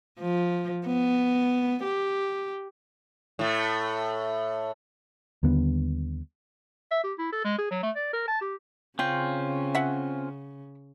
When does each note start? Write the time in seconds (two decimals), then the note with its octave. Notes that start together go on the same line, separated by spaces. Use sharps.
0.20 F3
0.86 B3
1.83 G4
3.39 A2 A3
5.43 D#2 D3 G3 B3
6.91 E5
7.04 G4
7.18 E4
7.32 A4
7.44 G#3
7.58 G#4
7.71 F#3
7.83 A3
7.96 D5
8.13 A#4
8.28 A5
8.41 G4
8.99 C#3 C4 C#4 F4 G5
9.75 E5 F#5